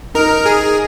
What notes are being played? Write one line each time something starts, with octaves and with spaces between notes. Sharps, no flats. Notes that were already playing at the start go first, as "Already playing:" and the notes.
D#4 A#4
G#4